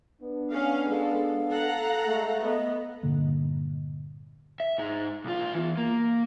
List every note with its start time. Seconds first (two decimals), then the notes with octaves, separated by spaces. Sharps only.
0.21 B3 D4
0.51 C#4 F5
0.89 G#3 A4 F5
1.50 A4 F#5 A#5
2.06 G#3 A3
2.42 B3 D#5
3.03 G2 A#2 D3 A#3
4.60 E5
4.78 G#2 D#4
5.25 B1 F4
5.54 E2 E3
5.78 A#3